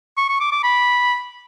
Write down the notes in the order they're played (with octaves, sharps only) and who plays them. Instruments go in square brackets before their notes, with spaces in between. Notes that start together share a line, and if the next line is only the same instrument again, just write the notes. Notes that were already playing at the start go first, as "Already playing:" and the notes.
[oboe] C#6
C#6
D6
D6
B5